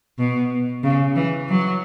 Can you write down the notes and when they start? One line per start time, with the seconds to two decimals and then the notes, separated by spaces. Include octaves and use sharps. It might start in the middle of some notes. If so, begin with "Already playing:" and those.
0.19 B2
0.83 C#3
1.16 E3
1.49 F#3